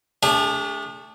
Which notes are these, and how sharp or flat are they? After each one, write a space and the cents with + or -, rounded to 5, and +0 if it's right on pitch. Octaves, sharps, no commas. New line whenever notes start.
A3 +0 D4 -30 G#4 -45